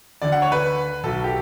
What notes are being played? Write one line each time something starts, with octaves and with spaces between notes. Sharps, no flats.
D2 D3 D5
F#5
C#5
B4
B1 B2 A4
G4